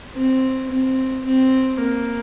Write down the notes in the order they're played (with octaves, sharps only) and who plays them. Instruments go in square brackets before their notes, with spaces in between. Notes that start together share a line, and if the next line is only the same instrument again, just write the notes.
[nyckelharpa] C4
C4
C4
A#3